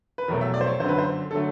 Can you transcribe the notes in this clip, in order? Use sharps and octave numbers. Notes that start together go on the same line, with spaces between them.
B4
F1 E2 B2 F#3 A3 A#4
E5
D5
C5
C#5
G1 F#2 D3 C5
B4
C5
D3 F#3 A3 A4